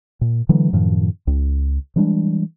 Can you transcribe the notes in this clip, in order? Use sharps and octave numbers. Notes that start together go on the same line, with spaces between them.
A#2
D3 E3 F#3 G#3
F#2 A2 D#3 F3
C#2
E3 G3 G#3 D4